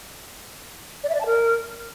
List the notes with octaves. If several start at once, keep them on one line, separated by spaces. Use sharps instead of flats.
D5
E5
D5
A5
A#4